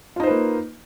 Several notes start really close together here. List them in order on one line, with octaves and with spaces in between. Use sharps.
F4 D#4 C5 B4 A#3